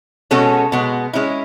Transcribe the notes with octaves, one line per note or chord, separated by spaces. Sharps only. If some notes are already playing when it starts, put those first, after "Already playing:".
B2 G#3 C#4 F#4 A4
B2 G#3 B3
G#3 C#4 E4